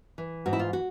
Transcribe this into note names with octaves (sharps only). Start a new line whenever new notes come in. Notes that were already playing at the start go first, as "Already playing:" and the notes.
E3
G#2 F#4
E4
F4
F#4